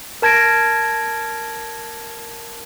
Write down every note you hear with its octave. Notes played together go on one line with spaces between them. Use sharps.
A#4 A5 G#6 A#6 D7